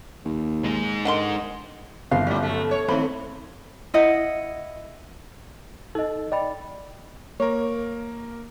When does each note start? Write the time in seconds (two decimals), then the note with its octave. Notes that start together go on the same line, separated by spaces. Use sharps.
0.25 D#2
0.64 G#3 D#4
1.05 D3 D#3 C6
2.11 G1 E3 F5
2.27 A2 G3 C#4
2.43 F#3 A3
2.71 C#5
2.88 D#3 A3 C4 B5
3.94 E4 D#5 F#5
5.95 D#4 A4 D#5
6.32 D5 D#5 G5 B5
7.40 A#3 A#4 C#5